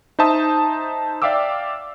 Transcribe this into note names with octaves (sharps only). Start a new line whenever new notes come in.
D#4 C5 E5 A5 D#6
D5 E5 F5 G5 D6 E6